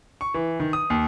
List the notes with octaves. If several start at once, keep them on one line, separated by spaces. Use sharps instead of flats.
C#6
E3
D#3
D#6
D#2